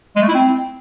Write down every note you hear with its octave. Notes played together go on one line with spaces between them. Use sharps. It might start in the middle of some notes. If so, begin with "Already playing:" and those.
G#3
A3
E4
C4